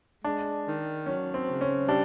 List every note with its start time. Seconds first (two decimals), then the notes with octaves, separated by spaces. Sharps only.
0.24 G#3 D4
0.66 D#3
1.06 F#3 C#4
1.34 C4
1.48 C#3
1.61 C#4
1.89 G3 D4